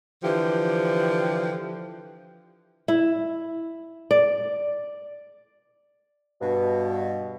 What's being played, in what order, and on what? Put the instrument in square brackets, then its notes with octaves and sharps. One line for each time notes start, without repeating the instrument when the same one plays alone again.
[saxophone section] D3 E3 F3 G4
[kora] E4
D5
[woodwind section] G2 B2